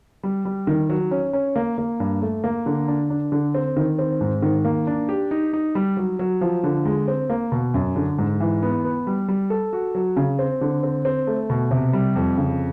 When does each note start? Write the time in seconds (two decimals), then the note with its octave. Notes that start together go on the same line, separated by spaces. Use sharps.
0.23 G3
0.45 G3
0.67 D#3
0.90 F#3
1.11 C#4
1.33 C#4
1.56 A#3
1.78 A#3
2.00 G2
2.22 A3
2.44 A#3
2.66 D3
2.88 D4
3.10 D4
3.32 D3
3.54 C4
3.77 D#3
3.99 C4
4.21 G#2
4.42 D#3
4.65 A#3
4.87 D4
5.09 G4
5.31 D#4
5.53 D#4
5.75 G3
5.97 F#3
6.19 F#3
6.41 F3
6.63 D3
6.85 G#3
7.08 C4
7.30 A#3
7.52 B2
7.74 F#2
7.96 D3
8.18 G#2
8.40 E3
8.63 B3
8.84 B3
9.07 G3
9.28 G3
9.50 A4
9.73 F#4
9.95 F#3
10.17 C#3
10.39 C4
10.61 D3
10.83 C4
11.05 C4
11.27 A3
11.50 B2
11.71 C3
11.93 G3
12.16 F2
12.38 C#3